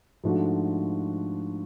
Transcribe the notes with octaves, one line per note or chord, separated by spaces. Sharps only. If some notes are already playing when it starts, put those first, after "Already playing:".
G#2 F3 A3 D4 F#4